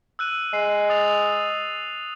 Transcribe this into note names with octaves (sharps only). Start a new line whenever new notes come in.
E6 F#6 D#7
G#3 C7
D#6 A6 F7